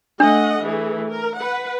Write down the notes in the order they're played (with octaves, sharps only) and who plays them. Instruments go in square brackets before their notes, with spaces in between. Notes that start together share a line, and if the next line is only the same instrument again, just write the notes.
[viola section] A3 D#5 F#5 [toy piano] D4
[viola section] E3 A3 G#4
A#4
B4 F#5